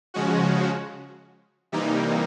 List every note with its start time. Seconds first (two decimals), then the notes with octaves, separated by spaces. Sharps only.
0.14 C#3 F3 G#3 C#4 F#4
1.72 C3 E3 G3 A#3 D#4